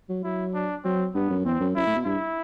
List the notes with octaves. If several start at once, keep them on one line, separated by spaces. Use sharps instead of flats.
F#3
F#3 E4
D4
F#3 C4
G2 B3
F#2
E2 C4
F#2
F#2 E4
A2
B2
G2 E4